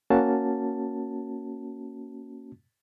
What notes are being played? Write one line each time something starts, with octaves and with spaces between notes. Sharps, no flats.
A#3 C#4 F#4 A5